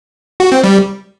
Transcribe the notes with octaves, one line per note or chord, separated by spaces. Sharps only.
F#4
C4
G3